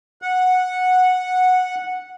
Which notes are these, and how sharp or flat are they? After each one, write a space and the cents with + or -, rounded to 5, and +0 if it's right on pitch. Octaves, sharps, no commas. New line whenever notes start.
F#5 -10